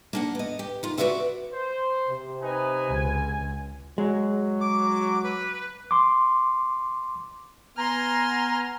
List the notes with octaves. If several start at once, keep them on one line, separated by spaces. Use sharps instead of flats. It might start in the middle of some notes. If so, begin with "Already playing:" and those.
A#3 D4 F#5
B3 D#5
G4
D#3 F4
F#4 A#4 B4 D5 E5 F#5
C5
C3
D#4 B4 G#5
C#2 G#5
F#3 G#3
D6
B4
C6 D6
B3 G#5 A#5 C6 F6